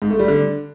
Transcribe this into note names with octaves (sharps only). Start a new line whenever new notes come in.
G#2
A3
G3
D3